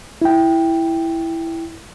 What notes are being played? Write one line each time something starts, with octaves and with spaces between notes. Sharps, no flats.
E4 G5